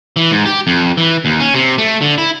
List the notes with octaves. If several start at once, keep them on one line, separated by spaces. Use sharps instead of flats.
E3
G#2
G4
F2
E3
D#2
C#4
C3
A3
D3
E4